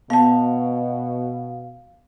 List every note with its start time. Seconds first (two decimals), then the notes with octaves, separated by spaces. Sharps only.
0.10 B2 B3 F5 A5